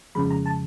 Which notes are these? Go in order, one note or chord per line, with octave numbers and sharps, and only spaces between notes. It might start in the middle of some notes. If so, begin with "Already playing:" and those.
F2 C#3 F3 G#3 B5
A#5
A5